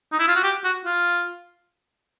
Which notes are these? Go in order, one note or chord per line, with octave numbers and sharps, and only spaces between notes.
D#4
E4
F4
F#4
G4
F#4
F4